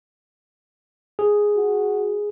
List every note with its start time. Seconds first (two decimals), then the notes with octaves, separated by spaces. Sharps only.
1.19 G#4
1.57 F#4